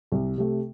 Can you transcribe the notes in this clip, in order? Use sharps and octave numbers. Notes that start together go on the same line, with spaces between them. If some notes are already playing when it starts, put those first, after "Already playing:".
C2
C3 A3